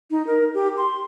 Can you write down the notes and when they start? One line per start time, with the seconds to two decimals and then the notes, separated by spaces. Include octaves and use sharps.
0.11 D#4
0.27 A#4
0.54 G4
0.77 C6